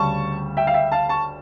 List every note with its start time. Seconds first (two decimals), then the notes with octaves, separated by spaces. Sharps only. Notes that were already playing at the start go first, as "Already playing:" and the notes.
Already playing: D2 C#3 G3 A5 C#6
0.57 E5 G5
0.67 F5
0.74 E5 G5
0.92 F5 A5
1.09 A5 C#6